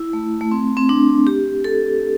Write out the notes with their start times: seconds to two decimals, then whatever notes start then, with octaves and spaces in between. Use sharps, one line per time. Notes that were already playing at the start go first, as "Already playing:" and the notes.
Already playing: E4
0.13 A3
0.41 A3
0.52 C4
0.77 C4
0.89 D4
1.27 G4
1.64 A4